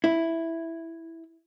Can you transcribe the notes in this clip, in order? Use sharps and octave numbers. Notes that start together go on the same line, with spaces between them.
E4